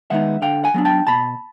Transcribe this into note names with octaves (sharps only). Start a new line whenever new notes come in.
D#3 G#3 B3 D#4 E5 F#5
D3 F5 G5
F#5 G#5
F#3 B3 D4
G5 A5
B2 A5 B5